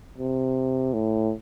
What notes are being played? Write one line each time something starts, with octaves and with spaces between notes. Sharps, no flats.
C3
A2